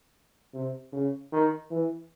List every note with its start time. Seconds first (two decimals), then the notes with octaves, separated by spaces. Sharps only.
0.54 C3
0.92 C#3
1.32 D#3
1.70 E3